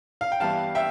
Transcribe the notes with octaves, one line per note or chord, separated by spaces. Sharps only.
F5
G5
G2 E3 G3 B3 F5 A5
E5 G5